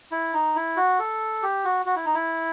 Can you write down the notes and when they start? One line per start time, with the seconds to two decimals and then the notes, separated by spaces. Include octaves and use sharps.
0.12 E4
0.34 D#4
0.56 E4
0.77 F#4
0.99 A4
1.43 G4
1.65 F#4
1.86 F#4
1.96 E4
2.05 D#4
2.15 E4